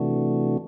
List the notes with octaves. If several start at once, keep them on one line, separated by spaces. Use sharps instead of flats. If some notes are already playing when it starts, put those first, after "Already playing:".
Already playing: C3 E3 A3 D4 F#4